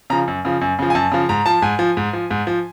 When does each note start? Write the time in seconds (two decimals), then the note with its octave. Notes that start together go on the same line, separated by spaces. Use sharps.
0.10 C#3 F3 A#5
0.28 F#2
0.45 C#3 F3
0.61 F#2
0.79 C#3 F3
0.90 G#5
0.95 F#2 A5
1.11 C#3 F3
1.29 G#2 A#5
1.46 F3 A5
1.62 G#2 G#5
1.79 F3
1.97 G#2
2.13 F3
2.31 G#2
2.47 F3